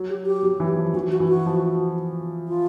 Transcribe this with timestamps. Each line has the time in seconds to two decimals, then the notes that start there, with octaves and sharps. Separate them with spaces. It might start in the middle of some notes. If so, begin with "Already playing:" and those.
Already playing: F#3
0.10 G4
0.26 G4
0.43 F#3
0.60 E3
0.78 F3
0.94 E3 F#4
1.11 F#4
1.20 E3
1.29 F#4
1.46 F3
2.48 F4